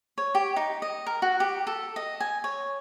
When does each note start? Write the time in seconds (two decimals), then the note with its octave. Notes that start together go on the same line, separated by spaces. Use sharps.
0.18 C#5
0.35 G4
0.56 D#4
0.82 D#5
1.07 A#4
1.22 F#4
1.40 G4
1.67 A4
1.96 D#5
2.20 G#5
2.44 C#5